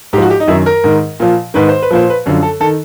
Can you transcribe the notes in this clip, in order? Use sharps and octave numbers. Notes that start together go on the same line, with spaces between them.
G#2 F3 F#4 G4
G4
D#4
F#2 D#3 E4
A#4
G#2 D#3
A#2 F3
G#2 D#3 B4
C5
B4
A#2 F3 C5
B4
F#2 D3 F3
A4
D#3 A4